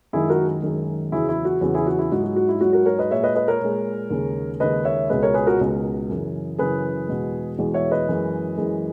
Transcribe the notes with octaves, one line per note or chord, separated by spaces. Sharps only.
F#2 D#3 G#3 E4 G#4
F#4 A#4
F#2 D#3 G#3
E2 C#3 F#3 E4 G#4
E4
F#4
E2 C#3 F#3 F#4
E4 G#4
F#4
E4
G#2 F#3 F#4
F#4
F#4
E4
G#2 F#3 F#4
F#4 A#4
A#4 C#5
B4 D#5
A#2 G#3 C#5 E5
B4 D#5
B4 D#5
A#4 C#5
A#2 G#3
D#2 C#3 G#3
D#2 C#3 G#3 B4 D#5
C#5 E5
C#2 B2 G#3 B4 D#5
A#4 C#5
G#4 B4
F#4 A#4
C#2 B2 G#3
F#2 C#3 E3
F#2 C#3 E3 G#4 B4
E2 B2 G#3
E2 B2 G#3
C#5 E5
B4 D#5
F#2 E3 G#3
F#2 E3 G#3